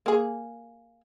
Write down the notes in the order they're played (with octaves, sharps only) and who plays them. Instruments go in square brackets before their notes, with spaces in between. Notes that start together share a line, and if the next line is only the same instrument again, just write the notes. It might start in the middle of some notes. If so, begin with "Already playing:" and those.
[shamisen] A#3 G#4